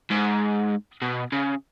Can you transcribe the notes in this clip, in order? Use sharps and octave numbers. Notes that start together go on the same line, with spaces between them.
G#2
B2
C#3